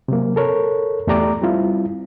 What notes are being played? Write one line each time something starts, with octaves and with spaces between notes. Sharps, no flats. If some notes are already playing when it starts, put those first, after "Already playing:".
C3 F#3 A#3
A4 A#4 C#5
E2 A3 G4 D5 A#5 D6
G3 C4 E4 F4